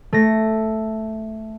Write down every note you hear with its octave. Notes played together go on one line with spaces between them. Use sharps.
A3 A#6